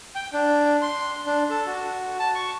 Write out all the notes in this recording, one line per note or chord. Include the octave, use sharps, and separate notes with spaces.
G5
D4
C6
D4
A4
F#4
A5
C#6